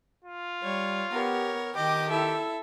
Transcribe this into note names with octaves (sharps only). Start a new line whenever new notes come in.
F4
G3 C#5
B3 G4 A#4 C#5
D#3 G4 D#5 G5 D6
E4 A4 E5